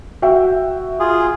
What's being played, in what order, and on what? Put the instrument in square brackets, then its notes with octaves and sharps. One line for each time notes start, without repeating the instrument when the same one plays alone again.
[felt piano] F#4 E5 G5
[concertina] F4 G#4